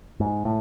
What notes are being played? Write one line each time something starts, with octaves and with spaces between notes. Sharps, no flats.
G#2
A2